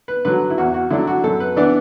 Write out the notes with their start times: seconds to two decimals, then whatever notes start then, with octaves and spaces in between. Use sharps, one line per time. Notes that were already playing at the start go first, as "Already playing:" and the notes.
0.08 B4
0.25 D3 F#3 B4
0.50 E4
0.58 E2 F#4
0.74 F#4
0.90 D3 F#3 D4 E4
1.07 F#4
1.24 F#2 A4
1.40 B4
1.56 E3 B3 D4 D5